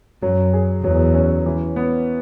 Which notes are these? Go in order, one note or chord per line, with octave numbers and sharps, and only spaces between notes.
F#2 F#3
G#4
E2 F#3
C#4
E3
B3